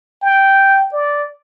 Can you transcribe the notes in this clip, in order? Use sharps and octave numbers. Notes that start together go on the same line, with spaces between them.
G5
D5